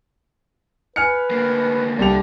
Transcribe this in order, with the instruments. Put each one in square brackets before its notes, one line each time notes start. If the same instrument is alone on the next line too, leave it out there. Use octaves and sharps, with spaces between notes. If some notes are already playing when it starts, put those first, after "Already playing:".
[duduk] B4 [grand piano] G#5 F6 C#7
[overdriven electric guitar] D2 A#3
[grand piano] C2 G4 F7 [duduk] A#3 [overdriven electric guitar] D4 A4